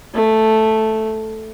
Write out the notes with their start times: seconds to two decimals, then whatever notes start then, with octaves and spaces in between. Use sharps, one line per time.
0.14 A3